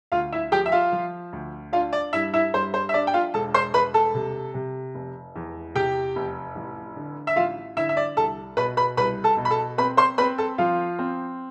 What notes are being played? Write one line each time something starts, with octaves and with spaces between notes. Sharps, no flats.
D2 F4 F5
E4 E5
F3 G4 G5
E5
F4 F5
F3
D2
D4 F4 F5
D5
G2 E4 E5
E4 E5
G2 C5
C5
E5
D4 D5
G5
F4 F5
E1 A4 A5
C5 C6
E1 B4 B5
A4 A5
C3
C3
F1
E2
C3 G4 G5
F1
A1
D3
E5
A1 F4 F5
D3 E4 E5
E5
D5
C2 A4 A5
B2 B4 B5
B4 B5
C2 B4 B5
A4 A5
B2
B5
A4 A5
C4 B4 B5
C5 C6
C4 B4 B5
A4 A5
F3 F4 F5
C4